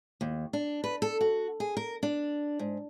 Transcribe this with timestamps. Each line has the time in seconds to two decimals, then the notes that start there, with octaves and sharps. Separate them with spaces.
0.21 D#2
0.53 D4
0.84 B4
1.02 A4
1.21 F#4
1.60 G#4
1.77 A#4
2.03 D4
2.59 G#2